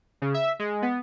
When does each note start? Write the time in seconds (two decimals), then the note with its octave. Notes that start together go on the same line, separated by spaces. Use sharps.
0.22 C#3
0.34 E5
0.59 G#3
0.82 B3